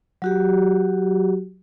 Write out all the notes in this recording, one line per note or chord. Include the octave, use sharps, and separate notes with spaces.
F#3 F#4 G4